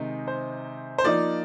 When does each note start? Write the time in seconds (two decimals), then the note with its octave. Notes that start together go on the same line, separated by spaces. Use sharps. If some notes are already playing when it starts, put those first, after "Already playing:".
Already playing: C3 D#3 G#3 D#4
0.28 C5
0.98 C5
1.04 F3 A#3 D#4 D5